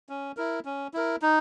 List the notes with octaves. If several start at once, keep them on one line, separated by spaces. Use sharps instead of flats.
C#4
E4 A#4
C#4
E4 A#4
D#4